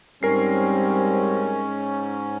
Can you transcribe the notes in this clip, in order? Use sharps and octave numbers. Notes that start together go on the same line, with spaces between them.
G#2 G3 C4 C#4 A#4 C7